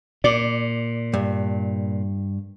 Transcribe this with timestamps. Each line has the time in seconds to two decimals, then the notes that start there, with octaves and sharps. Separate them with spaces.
0.24 A#2 D5 D6
1.13 G2